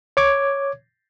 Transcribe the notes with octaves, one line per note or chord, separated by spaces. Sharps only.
C#5 D6 G#6